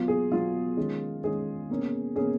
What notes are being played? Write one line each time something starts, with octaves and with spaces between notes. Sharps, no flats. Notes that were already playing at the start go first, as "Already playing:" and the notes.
Already playing: B2 F#3 B3 F4
G#4
B2 F#3 B3 F4
D#3 G#3 C#4
D#3 G#3 C#4 G#4
B2 A#3 C#4
B2 A#3 C#4 G#4